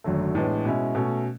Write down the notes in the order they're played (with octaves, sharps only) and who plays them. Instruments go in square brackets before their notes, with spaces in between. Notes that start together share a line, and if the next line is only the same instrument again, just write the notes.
[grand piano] G#1 F#2 D3 F#3 A3
A1 A2 G#3 B3 D4
B2 G#3 C#4 E4
B2 A3 C#4